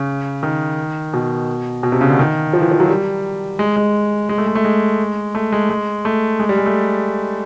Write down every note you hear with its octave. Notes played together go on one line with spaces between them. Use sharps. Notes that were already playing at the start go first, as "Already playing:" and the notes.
Already playing: C#3
D#3
B2
B2
C3
C#3
D3
D#3
F3
E3
F3
F#3
G3
G#3
G#3
G#3
A3
G#3
A3
G#3
A3
G#3
G#3
A3
G#3
G3
G#3
A3